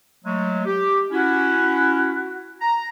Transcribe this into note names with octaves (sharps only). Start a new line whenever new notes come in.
F#3 G#3 A3
G4
C#4 E4 F#4
A#5